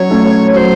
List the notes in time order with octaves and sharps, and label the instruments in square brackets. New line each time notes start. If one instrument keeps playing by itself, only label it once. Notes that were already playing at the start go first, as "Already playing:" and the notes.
Already playing: [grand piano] F#3 C#4 [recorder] C#5
[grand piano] A3 C#4
[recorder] C#5
[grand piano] F#3 [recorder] C5